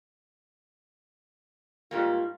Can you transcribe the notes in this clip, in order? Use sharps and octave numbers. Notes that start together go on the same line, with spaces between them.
G#2 G3 A#3 F4